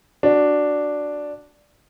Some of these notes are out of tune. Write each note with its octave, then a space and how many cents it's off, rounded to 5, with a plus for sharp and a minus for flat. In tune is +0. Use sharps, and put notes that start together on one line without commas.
D4 +0 F#4 +0